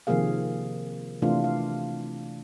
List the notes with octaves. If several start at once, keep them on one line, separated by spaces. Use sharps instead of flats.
C3 D#3 F3 A#3 G#4 F5
C3 E3 A3 D4 F4 F5
F5